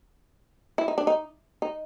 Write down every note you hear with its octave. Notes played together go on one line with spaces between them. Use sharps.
E4
D#4
D4
D#4
D#4